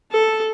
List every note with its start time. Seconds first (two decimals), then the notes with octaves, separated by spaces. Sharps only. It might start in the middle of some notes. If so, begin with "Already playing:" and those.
0.11 A4